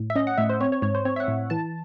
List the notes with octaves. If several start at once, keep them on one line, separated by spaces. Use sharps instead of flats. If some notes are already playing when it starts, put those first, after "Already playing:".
Already playing: A2
E5
C#4 D#5
F#5
A2 E5
C5
C4 C#5
C#5
G#2 C#5
C5
C4 C#5
E5
F#5
A2
E3 A5